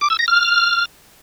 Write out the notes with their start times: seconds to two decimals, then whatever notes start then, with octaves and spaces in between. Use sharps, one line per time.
0.01 D6
0.10 E6
0.19 A#6
0.28 F6